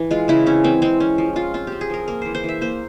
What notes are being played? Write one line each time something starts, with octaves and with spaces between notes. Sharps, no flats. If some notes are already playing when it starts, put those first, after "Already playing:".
Already playing: E3
G#3 F4
C#3 E4
C4 C#4
E3 C4
G#3 C4
C4 C#4
F3
F3 F4
C4 F4
C4 G4
G#4
F3 A#4
A#3 A#4
E3 C5
C5
E3 E5
A#3 C5